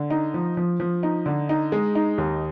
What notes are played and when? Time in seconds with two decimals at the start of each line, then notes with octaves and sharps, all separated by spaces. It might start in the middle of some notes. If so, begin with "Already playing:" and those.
Already playing: D3
0.10 D#4
0.34 F3
0.57 F3
0.80 F3
1.03 D#4
1.26 D3
1.49 D#4
1.72 G#3
1.95 D#4
2.18 D#2